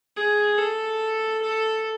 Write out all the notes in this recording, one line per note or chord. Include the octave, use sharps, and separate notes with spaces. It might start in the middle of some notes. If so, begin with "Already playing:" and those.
G#4
A4
A4